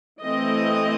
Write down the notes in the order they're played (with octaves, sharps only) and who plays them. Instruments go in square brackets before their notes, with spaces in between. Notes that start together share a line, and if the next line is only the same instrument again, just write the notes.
[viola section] E3 A3 C4 D#5